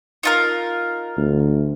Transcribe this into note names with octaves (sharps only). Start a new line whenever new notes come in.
D#4 F4 A#4
D2